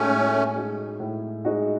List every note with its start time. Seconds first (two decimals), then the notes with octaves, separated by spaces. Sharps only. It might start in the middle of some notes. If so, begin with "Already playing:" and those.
Already playing: A2 G#3 A3 C#4 D#4 F#4
0.11 A2
0.56 G#3 D#4 F#4
1.00 A2
1.45 G#3 D#4 F#4